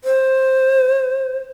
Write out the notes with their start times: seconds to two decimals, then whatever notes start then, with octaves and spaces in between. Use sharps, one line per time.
0.04 C5